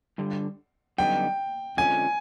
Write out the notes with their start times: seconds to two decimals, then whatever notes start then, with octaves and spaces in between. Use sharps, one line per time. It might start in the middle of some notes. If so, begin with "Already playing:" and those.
0.18 G2 D3 G3
0.98 F#2 D3 G3 B3 D#4 G5
1.77 F2 D3 F3 G#3 C#4 G#5